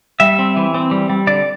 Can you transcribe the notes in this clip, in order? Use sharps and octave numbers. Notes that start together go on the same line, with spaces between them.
G3 E5
C4
E3
C4
G3
G3
D3 D5